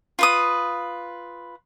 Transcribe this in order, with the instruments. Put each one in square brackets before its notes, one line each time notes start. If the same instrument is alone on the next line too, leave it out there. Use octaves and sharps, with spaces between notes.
[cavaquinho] F4 B4 D#6